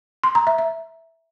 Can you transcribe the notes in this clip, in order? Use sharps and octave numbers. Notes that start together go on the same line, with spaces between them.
C6
A#5
E5
E5